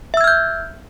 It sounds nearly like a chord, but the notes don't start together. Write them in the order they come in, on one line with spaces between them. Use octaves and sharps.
E5 E6 G#6 F6 G6